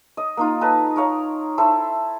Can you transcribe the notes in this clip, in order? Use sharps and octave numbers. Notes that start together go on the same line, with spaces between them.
D#5
A#3 D#4 F4
A4 B4 D#5 A5
A#4 C#5 F5
E4 A4 C5